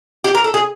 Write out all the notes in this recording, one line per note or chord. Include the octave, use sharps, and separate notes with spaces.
G4
A#4
A4
G#4